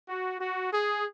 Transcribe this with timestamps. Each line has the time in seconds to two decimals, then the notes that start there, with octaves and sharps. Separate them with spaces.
0.09 F#4
0.40 F#4
0.72 G#4